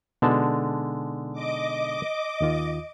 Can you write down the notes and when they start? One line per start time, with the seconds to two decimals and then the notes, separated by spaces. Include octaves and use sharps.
0.22 B2 D3 G#3 B3 D#4 A5
1.33 D#5 D6
2.41 D#2 D#3 F4